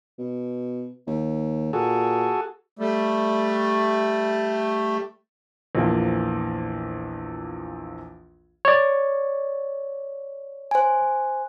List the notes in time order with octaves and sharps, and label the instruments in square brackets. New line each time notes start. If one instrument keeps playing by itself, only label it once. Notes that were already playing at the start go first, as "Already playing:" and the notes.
[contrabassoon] B2
D#2
[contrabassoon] A#2 [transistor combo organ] F#4 G#4 A4
[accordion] G3 A3
[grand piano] A#1 E2 F3 A#3
[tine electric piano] C#5 D5
[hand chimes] C5 G#5